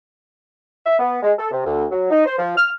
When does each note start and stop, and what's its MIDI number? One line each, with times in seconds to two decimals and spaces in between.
0.86 0.98 76
0.99 1.17 59
1.22 1.32 56
1.38 1.46 69
1.51 1.62 48
1.65 1.85 38
1.91 2.08 54
2.11 2.25 63
2.26 2.38 72
2.39 2.54 53
2.57 2.70 89